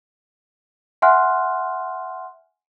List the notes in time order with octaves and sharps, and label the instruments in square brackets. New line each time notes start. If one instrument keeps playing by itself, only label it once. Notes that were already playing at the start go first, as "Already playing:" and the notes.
[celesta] E5 F#5 G#5 C6 F6 F#6